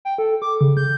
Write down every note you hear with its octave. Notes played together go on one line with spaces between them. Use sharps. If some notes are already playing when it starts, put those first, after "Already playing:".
G5
A4
D6
C#3
G6